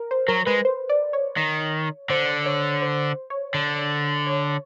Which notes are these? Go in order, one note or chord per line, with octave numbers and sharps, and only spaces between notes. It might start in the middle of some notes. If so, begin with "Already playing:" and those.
Already playing: A#4
C5
F#3 A#4
G#3 B4
C5
D5
C#5
D#3
D3 C5
C#5
C5
C#5
D3
C#5